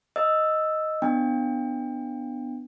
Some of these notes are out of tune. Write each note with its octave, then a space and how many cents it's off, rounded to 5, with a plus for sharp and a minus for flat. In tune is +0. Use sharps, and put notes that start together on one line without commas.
D#5 +0 E6 +0
B3 +15 D4 +20 G5 +25